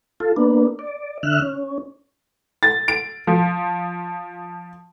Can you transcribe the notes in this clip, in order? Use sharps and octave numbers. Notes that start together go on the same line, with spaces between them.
F4 A4
A#3 B3 D4
D5
D3 E5 F6 F#6
C#4
A6
D7
F3